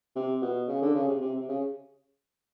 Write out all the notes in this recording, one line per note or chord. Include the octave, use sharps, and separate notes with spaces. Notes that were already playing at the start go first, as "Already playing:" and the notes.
C3
B2
C#3
D3
C#3
C3
C3
C3
C#3